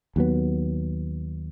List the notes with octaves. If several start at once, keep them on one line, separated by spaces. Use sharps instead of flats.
D#2 F#3 B3